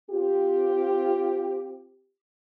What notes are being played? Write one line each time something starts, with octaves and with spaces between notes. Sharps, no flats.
C4 F4 G4